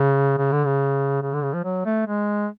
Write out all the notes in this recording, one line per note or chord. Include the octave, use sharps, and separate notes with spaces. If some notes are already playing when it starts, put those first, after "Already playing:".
Already playing: C#3
C#3
D3
C#3
C#3
D3
C#3
F3
F#3
A3
G#3